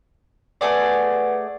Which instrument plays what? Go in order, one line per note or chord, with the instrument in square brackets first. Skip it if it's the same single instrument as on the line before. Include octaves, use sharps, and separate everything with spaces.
[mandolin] A3 G#4 D5 [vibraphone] B4 F#5